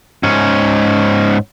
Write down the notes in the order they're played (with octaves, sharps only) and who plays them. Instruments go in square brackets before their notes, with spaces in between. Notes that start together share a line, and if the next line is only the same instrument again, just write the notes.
[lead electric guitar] G#2 C#4